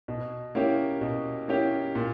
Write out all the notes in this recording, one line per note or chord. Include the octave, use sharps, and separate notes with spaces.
B2
A#3 C#4 E4 G4
B2
A#3 C#4 E4 G4
A#2